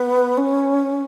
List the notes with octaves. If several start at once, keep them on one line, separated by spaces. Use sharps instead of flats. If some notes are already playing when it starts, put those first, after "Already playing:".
Already playing: B3
C#4